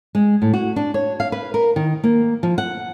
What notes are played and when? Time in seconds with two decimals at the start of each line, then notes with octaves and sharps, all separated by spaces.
0.15 G#3
0.42 A2
0.53 F#4
0.76 D4
0.94 C#5
1.20 F5
1.32 B4
1.54 A#4
1.76 D#3
2.04 A#3
2.43 F3
2.58 F#5